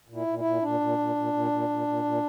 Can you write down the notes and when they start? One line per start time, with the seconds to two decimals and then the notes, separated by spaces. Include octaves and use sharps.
0.09 A#2
0.15 E4
0.27 A#2
0.39 E4
0.44 A#2
0.62 A#2 D4
0.80 A#2
0.98 A#2
1.16 A#2
1.33 A#2
1.51 A#2
1.69 A#2
1.87 A#2
2.05 A#2